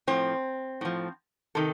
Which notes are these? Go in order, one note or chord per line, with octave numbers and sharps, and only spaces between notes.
A2 F3 C4
A2 F3
C3 D#3 A4